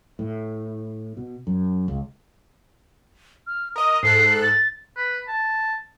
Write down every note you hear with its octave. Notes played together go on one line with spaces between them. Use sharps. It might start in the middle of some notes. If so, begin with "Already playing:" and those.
A2
B2
F#2
C#2
F6
A#4 D#5 D#6
G#2 A4 F#6 C7
A6
B4
A5